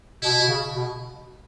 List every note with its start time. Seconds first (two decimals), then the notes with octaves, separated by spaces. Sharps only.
0.22 B2 E4
0.38 B2
0.48 C#3
0.74 B2